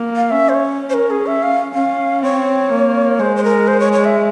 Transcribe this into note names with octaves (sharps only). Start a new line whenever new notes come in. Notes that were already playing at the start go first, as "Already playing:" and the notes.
Already playing: A#3
F5
C#4 E5
C5
C#5
C5
A#4
G#4
E5
F5
C#4 F5
C4 C#5
A#3
G#3 C5
C5
A#4
C5
C#5
C#5
E5